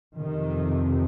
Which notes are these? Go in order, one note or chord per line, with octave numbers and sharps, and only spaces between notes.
F2 C3 D#3